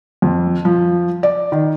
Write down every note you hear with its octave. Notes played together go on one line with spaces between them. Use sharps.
F2
F3
D5
D#3